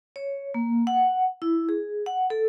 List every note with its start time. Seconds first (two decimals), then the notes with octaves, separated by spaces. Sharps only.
0.16 C#5
0.54 A#3
0.87 F#5
1.42 E4
1.69 G#4
2.06 F#5
2.30 A4